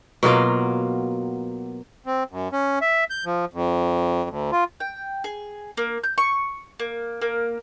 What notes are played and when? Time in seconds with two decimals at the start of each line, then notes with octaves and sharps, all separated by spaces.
0.23 B2 F#3 A#3 F4
2.06 C4
2.31 F#2
2.52 C#4
2.82 E5
3.10 G6
3.25 F3
3.53 F2
4.30 D2
4.52 F4
4.80 G5
5.24 G#4
5.77 A#3
6.04 G6
6.18 C#6
6.79 A#3
7.22 A#3